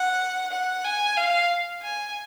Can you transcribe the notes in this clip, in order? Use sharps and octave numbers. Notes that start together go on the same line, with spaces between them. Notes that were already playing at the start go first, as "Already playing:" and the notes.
Already playing: F#5
F#5
G#5
F5
G#5